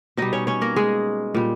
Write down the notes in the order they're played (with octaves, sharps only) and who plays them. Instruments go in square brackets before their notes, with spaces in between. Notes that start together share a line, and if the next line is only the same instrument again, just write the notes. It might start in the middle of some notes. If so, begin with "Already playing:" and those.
[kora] B2 G3 D#4 D#5
C#4 C#5
C#4 C#5
A#3 A#4
G#3 G#4
A#2 G3